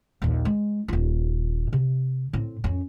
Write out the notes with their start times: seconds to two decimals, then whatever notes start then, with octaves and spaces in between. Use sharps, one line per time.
0.22 A#1 D#2
0.45 G#3
0.88 D#1 F4
1.73 C3
2.33 A2 C4
2.64 F2 C#4